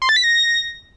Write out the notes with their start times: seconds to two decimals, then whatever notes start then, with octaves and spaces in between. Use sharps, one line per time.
0.02 C6
0.09 A6
0.16 B6
0.24 A#6